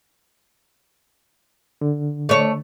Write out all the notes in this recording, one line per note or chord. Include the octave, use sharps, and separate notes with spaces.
D3
A3 C#5